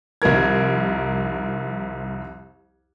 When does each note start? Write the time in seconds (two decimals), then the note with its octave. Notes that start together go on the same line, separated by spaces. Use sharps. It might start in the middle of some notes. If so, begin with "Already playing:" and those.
0.22 C2 F2 D#3 A#4 G#6